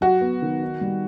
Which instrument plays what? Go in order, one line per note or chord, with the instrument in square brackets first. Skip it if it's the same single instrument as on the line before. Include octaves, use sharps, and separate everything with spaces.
[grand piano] F#3 [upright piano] F#4
[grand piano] B3
D#3
D#4
G3